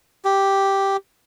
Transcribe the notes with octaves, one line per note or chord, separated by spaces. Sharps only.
G4